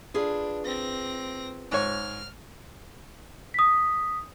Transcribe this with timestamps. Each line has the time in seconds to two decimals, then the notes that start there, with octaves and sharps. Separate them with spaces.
0.14 D4 F4 G#4 B4
0.65 C4 A#6
1.72 G#2 C#5 F6
3.54 D#6 B6